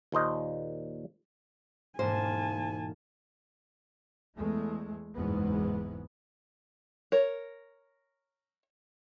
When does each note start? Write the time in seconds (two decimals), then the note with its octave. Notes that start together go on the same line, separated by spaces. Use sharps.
0.12 D#2 A#2 C5 D#5
1.99 E1 G#2 A#3 C5 G#5 A5
4.35 E2 G#3 A3
5.15 F#1 E2 G#2 G#3 B3
7.12 A#4 C#5